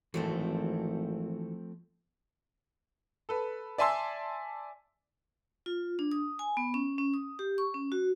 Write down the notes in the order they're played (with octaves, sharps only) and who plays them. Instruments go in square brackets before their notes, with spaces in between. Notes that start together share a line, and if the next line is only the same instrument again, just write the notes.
[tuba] G#1 [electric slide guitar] E3 F#4 A4 [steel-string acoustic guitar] F3 A3 C4
[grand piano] A4 B4
D5 E5 G#5 A5 C6 E6
[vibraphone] F4
D4
D#6
G#5
B3
C#4
C#4
D#6
G4
C#6
C#4
F#4